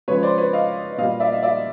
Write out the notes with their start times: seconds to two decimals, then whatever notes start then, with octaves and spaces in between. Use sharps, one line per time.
0.08 C#3 F3 G#3 B4 C#5
0.23 C5 D5
0.38 B4 C#5
0.53 D#5 F5
0.98 A#2 G3 D#5 F5
1.20 D5 E5
1.32 D#5 F5
1.43 D5 E5